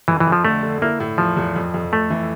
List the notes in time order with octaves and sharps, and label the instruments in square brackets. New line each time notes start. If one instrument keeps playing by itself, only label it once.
[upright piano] F2 [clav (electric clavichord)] E3
[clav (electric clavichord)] E3
[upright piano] F2
[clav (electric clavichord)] F3
[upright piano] D3 [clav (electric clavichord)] A3
[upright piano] D3
[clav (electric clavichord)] A#3 [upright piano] E4
[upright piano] A2
[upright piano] E2 [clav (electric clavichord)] F3
[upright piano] E2
F2
F2
[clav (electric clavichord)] A3 [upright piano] A4
[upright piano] E3